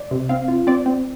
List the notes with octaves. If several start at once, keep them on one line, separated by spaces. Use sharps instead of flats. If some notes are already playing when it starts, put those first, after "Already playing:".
Already playing: D5
C3
C4 F5
F4
C4 D5
C4